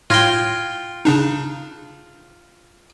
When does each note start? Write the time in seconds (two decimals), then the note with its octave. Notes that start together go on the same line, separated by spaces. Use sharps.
0.10 A2 F4 G5 G#6 A#6
1.05 C#3 D4 D#4